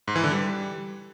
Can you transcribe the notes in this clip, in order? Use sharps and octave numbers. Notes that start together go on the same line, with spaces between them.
G#2
E3
D3
G3